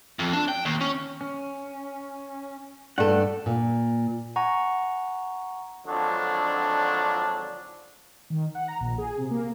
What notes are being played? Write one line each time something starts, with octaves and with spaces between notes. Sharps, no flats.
F2
D4
G5
D#2
C#4
C#4
G2 A3 F#4 A4 F#5
A#2
F#5 G#5 A#5 C#6
G#1 D3 F3 F#3 D4
D#3
F#5
A#5
A#1
G#4
C3
A#3